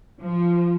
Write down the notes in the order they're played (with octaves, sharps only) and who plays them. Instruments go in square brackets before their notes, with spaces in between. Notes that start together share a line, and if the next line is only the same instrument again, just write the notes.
[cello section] F3